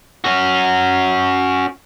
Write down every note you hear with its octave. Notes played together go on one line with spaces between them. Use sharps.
C#4 F#4